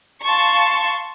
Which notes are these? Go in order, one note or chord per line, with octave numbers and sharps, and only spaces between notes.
F5 A5 C6 C#6